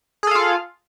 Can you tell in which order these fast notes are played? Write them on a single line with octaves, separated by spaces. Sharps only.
G#4 A4 F5 F4